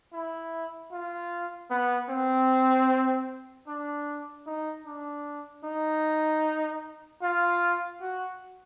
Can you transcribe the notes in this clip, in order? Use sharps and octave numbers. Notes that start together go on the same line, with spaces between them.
E4
F4
B3
C4
D4
D#4
D4
D#4
F4
F#4